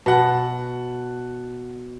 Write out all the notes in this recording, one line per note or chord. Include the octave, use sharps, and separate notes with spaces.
B2 F#5 A5